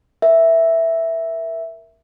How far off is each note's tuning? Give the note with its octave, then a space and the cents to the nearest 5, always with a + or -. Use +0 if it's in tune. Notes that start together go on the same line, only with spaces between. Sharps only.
A#4 +10 E5 +0